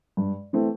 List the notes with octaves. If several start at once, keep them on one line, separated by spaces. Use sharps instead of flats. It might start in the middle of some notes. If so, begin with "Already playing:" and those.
G2
E3 A3 C4